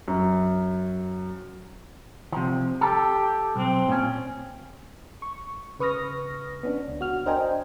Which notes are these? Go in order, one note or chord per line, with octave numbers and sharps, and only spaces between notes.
F#2
C3 F3
G4 A4
B1 C4
A#2 C#4
C#6
C#3 B4 C#6 D#6 F6 A#6
B3 C#4 D4
C#2
F#4 F6
D4 A#4 C5 D#5 G5 G#5